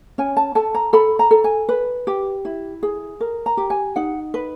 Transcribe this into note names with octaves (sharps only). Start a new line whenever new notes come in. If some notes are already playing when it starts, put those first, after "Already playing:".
C#4 G#5
A5
A4 A5
A#5
A4 B5
A#5
A4
G#5
B4
G4
E4
G#4
A#4
A#5
G4
G#5
D#4 F#5
B4